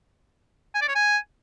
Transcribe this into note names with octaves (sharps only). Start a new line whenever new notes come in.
G#5
D5
C#5
G#5